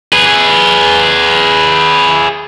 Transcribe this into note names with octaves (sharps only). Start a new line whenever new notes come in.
G#4 B4